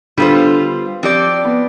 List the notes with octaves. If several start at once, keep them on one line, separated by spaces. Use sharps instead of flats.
D3 G3 B3 F4 C5
F3 C4 G4 D5
B3